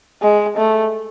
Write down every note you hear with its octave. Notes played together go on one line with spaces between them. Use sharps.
G#3
A3